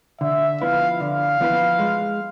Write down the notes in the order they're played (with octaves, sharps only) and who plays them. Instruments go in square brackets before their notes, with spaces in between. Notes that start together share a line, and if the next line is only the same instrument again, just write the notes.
[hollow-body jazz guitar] D3 [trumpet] E5
[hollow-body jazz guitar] F3 B3 E4 B4 [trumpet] F5
[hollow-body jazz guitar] D3 [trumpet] F5
[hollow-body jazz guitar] F3 B3 E4 B4
G#3